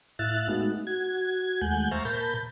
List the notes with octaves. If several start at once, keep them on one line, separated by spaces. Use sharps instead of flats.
A2 E4 E5 F5 F#6 A6
G#3 A3 B3 D#4 F#4
F#4 G#6
D#2 G#3 A3 F#5 G#5 G6
C5 E5 F5 A5 A#5 C#6
A#2 A#4 A5 B5 G6